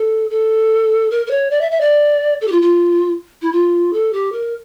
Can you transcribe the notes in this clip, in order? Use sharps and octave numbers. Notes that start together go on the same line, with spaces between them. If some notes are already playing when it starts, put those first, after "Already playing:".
Already playing: A4
A4
A#4
A#4
C#5
D5
E5
E5
D5
A4
G4
F4
F4
E4
F4
A4
G4
A#4